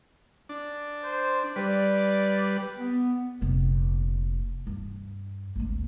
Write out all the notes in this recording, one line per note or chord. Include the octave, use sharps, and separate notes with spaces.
D4
C5
G3 B4 D5
B3
F1 A#2
G2 D4
G#1 D2